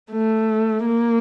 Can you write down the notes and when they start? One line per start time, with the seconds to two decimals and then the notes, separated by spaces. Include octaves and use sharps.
0.12 A3
0.85 A#3